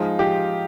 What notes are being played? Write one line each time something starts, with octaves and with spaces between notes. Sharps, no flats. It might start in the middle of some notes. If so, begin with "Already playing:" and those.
Already playing: F3 G#3 D#4 F4
F3 G4